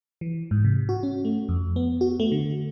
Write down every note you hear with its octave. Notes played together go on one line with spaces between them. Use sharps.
E3
G#2
C3
F#4
C#4
A3
F2
B3
F#4
A3
D3